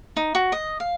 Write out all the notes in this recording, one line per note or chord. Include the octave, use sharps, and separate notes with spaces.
D#4
F#4
D#5
F5